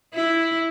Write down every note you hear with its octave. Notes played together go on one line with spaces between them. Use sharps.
E4